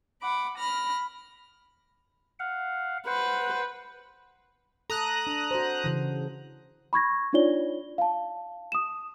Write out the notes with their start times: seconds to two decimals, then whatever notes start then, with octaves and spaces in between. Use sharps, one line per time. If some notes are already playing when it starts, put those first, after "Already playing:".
0.21 F#5 B5 D6
0.57 B5 F6 A#6
2.39 F5 F#5
3.07 B4 C5 F#5
4.90 A4 A#5 D#6 F#6
5.27 D4
5.51 F#4 C5
5.84 C#3 E3
6.93 B5 C#6 G#6 A#6
7.33 D4 D#4 F4 C#5 D5 G7
7.98 F5 A5
8.72 D#6 E7